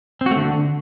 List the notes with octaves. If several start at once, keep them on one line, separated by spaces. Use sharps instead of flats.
C4
F#4
A3
D3